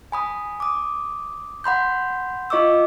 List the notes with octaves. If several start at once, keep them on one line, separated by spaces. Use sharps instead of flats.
G#5 B5 D#6
D6 D#6
F#5 B5 C6 G6
F4 D#5 C#6 D6 E6